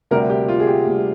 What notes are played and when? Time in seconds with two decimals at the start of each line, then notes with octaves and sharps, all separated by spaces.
0.11 D2 C3 G3 A#4
0.30 G4
0.48 F4
0.60 G#4
0.67 G4
0.86 D2 C3 G3